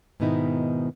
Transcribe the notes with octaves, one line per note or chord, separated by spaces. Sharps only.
G#2 B2 D#3 B3 D#4 E4